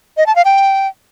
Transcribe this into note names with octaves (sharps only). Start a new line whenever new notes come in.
D#5
A5
F5
G5